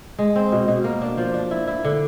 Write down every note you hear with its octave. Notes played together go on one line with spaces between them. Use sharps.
G#3
C4
B2
B2
A#3
D4
F3
D4
E4
E4
D3